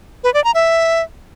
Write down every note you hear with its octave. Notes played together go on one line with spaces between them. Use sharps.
B4
D5
A#5
E5